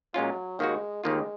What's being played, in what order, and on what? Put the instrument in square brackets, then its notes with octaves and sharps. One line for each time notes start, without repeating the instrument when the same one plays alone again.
[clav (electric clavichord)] A#2 G#3 C#4 F4 [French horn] F#3
[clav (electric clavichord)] D#2 D#3 A#3 D#4 F#4 [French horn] G#3
[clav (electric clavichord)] D#2 D#3 A#3 F4 [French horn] G#3